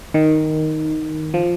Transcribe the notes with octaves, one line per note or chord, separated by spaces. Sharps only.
D#3
F3